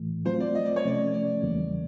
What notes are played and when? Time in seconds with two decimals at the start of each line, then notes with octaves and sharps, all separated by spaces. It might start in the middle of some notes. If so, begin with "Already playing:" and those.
Already playing: A2 E3 A3
0.25 F#3 A3 C4 F4 C5
0.40 D5
0.55 D#5
0.65 D5
0.76 C#5
0.84 C3 F3 A3 C#4 D5
1.14 D5
1.43 E2 C#3 E3 G3 A#3